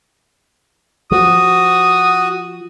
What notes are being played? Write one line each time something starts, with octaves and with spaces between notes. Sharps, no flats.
F3 F#4 D#6